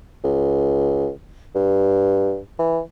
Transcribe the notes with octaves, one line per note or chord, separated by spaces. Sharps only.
C#2
G2
E3